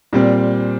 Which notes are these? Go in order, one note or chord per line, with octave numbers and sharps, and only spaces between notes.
A#2 G3 C4